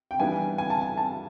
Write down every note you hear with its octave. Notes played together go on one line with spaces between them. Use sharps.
G5
E3 G3 B3 D4 G#5
G#5
A5
G#5
A5